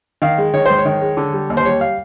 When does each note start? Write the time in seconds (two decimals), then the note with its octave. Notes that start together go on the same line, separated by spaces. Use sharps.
0.22 D#3 F5
0.38 G#3
0.54 D#3 C#5
0.66 G#2 C5
0.78 C#5
0.85 D#3
1.02 G#3
1.17 D3
1.33 G3
1.50 D#2
1.57 C5
1.65 G3 C#5
1.81 F5